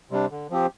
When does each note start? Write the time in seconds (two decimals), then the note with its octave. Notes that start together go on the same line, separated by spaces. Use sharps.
0.11 C3 G3 D4
0.31 D3
0.50 F3 C4 G4